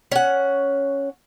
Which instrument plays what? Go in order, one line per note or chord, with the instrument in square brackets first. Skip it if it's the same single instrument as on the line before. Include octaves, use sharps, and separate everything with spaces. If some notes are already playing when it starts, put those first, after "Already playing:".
[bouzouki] C#4 F#5